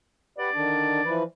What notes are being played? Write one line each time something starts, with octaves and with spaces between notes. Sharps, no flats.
G4 B4 D5 F#5
D3 D#3 D4
E3 F3 B4